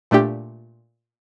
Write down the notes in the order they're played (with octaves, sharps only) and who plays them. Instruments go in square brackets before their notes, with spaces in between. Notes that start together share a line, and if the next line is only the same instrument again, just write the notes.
[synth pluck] A#2 A3 D4 G4